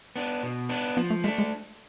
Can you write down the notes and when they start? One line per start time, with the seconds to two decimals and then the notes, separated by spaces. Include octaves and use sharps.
0.16 B3 D4
0.43 B2
0.69 B3 D4
0.97 F3 B3
1.10 A3
1.24 G#3 A3
1.28 D4
1.38 G#3